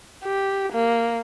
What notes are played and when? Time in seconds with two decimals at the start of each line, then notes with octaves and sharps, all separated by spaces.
0.24 G4
0.72 A#3